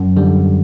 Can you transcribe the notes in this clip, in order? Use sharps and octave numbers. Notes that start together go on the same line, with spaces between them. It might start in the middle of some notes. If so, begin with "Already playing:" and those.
Already playing: F#2
D3 G3